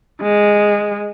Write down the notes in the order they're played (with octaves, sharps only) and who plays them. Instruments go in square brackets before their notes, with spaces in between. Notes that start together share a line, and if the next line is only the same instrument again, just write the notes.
[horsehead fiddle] G#3